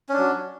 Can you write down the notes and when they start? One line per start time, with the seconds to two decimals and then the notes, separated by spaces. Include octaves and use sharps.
0.09 C#4
0.13 D4
0.17 F#3